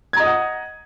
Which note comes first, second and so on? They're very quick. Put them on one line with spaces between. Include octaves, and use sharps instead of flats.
G#6 A#5 D#5 D#6 F#5